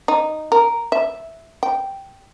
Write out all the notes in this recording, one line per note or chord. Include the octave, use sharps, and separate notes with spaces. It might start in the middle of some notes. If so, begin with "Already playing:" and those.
D#4
A#4
E5
G5